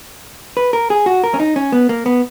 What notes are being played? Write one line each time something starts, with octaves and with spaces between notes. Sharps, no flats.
B4
A#4
G#4
F#4
A#4
C#4
D#4
C#4
B3
A#3
B3